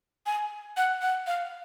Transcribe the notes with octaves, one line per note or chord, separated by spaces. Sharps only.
G#5
F#5
F#5
F5